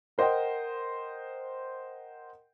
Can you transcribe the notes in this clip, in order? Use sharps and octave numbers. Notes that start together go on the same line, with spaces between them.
A#4 C5 D#5 F#5 G5